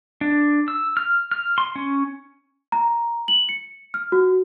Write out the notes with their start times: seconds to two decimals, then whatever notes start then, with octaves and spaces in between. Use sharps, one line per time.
0.21 D4
0.68 E6
0.97 F6
1.31 F6
1.58 C6
1.76 C#4
2.72 A#5
3.28 F#7
3.49 C#7
3.94 F6
4.12 F#4